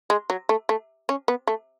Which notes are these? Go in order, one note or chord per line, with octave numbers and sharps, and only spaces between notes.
G#3
F#3
A3
A3
C#4
B3
A3